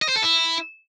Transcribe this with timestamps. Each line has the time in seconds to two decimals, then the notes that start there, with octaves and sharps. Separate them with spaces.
0.02 D#5
0.09 C5
0.16 A4
0.23 E4